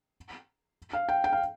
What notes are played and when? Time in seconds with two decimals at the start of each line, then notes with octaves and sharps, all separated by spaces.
0.93 F5
1.09 G5
1.24 G5
1.33 F5